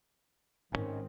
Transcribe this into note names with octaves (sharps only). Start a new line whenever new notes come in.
G#1 G#2 C3 D#3 C4 C#4